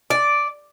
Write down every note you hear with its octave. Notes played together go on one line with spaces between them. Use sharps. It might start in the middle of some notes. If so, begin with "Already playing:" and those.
D5